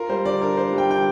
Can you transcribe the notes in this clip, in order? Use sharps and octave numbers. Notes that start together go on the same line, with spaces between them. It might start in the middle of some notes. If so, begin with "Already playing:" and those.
Already playing: F4 A#4
G3 C5
D3 D5
D4 A#4
F4 C5
G3
G5
D3 G5